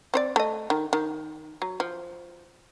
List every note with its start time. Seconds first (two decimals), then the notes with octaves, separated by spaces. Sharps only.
0.14 C4 C5 D5
0.36 A3 D#5
0.70 D#3
0.93 D#3
1.62 F#3
1.80 F3